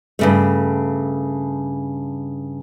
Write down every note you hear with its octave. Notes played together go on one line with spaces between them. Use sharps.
G2 C#3 A3